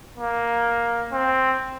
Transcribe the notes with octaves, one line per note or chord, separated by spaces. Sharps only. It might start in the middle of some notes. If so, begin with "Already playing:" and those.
A#3
C4